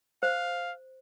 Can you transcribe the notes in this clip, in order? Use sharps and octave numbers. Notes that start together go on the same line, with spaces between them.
C5 F5